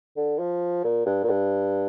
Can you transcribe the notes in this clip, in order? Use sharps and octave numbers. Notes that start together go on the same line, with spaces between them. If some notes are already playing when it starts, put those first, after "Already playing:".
D3
F3
A#2
G2
A#2
G2